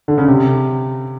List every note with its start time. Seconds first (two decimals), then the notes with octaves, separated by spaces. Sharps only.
0.08 D3
0.18 C#3
0.28 C3